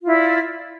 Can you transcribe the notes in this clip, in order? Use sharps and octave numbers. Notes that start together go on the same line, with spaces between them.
E4 F4 D5